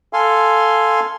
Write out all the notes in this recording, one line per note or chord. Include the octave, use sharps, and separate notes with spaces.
A4 F5 G#5 C6